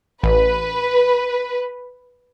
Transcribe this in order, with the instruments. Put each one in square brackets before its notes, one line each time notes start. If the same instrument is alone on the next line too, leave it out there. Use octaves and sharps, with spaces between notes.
[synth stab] A1 [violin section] B4